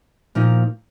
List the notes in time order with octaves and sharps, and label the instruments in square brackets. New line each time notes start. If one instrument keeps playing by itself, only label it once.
[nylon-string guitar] A#2 F3 A#3 D#4